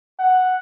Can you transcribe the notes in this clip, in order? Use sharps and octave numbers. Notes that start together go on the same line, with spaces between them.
F#5